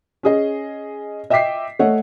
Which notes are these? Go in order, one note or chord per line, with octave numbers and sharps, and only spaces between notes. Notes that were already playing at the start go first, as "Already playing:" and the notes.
C#4 G#4 D#5
D#5 E5 G5 D6 B6 C7
A3 C#5 D#5 F#5